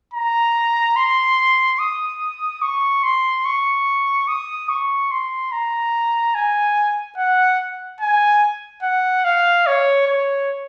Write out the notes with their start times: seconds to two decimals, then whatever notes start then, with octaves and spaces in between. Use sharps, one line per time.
0.14 A#5
0.97 C6
1.79 D#6
2.62 C#6
3.03 C6
3.46 C#6
4.28 D#6
4.69 C#6
5.11 C6
5.52 A#5
6.35 G#5
7.18 F#5
8.01 G#5
8.83 F#5
9.24 F5
9.67 C#5
10.07 C#5